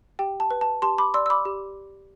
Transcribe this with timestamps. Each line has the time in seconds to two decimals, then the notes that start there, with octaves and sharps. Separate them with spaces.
0.19 G4 G5
0.40 A5
0.51 B4
0.61 A5
0.82 G4 A5 C6
0.98 B5 D6
1.14 D5 C6 E6
1.26 E6
1.30 B5 D6
1.45 G4